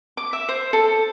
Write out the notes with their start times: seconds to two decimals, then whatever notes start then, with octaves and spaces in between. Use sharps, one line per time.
0.17 D6
0.33 E5
0.49 C5
0.73 A4